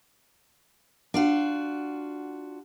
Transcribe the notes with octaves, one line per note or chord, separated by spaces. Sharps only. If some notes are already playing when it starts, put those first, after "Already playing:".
D4 F4 F#4